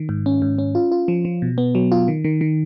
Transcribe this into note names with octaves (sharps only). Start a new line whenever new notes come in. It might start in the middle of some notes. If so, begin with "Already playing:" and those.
Already playing: D#3
G#2
C#4
G#2
C#4
F4
F4
F3
F3
B2
B3
F#3
F4
D#3
D#3
D#3